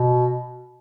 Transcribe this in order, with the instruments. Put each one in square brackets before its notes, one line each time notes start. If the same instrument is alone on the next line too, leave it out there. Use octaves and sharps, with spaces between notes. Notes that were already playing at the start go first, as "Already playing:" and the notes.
Already playing: [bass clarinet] B2